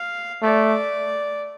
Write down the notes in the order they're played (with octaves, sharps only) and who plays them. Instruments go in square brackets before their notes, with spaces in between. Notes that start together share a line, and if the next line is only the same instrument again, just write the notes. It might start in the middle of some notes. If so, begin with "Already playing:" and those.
Already playing: [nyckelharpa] F5
[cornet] A3 [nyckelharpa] D5